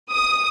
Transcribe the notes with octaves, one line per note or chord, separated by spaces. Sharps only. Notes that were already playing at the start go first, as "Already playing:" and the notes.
D#6